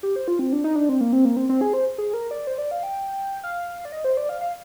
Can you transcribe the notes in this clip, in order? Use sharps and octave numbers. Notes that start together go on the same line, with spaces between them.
G4
C5
F4
C4
D4
D#4
D4
C4
A#3
C4
A#3
C4
C4
G#4
C5
G#4
A#4
D5
C5
D5
F5
G5
F5
D5
D#5
C5
D5
F5
F5